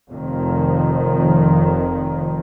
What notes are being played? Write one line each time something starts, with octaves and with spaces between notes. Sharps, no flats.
F1 F2 D#3